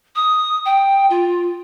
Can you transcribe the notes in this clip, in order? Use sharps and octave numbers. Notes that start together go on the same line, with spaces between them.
D#6
G5
F4